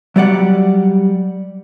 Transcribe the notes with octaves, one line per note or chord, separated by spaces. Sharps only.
F#3 G3 D5 F#5